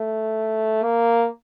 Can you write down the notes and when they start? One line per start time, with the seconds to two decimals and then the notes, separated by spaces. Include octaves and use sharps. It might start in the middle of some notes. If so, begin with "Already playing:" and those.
Already playing: A3
0.83 A#3